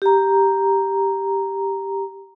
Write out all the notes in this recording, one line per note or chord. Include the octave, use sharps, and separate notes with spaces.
G4 A#5